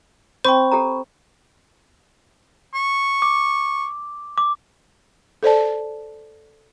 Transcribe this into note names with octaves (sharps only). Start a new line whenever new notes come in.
C4 C5 G5 B5 C#6
G4 A4 A#5
C#6
D6
D6
A4 C5 D5 A5